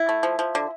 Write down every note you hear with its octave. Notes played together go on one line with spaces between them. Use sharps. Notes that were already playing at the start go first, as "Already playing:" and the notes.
Already playing: E4
A3
F3
F3
D3